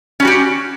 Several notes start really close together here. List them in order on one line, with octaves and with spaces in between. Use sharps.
C#4 G3 F#4 G4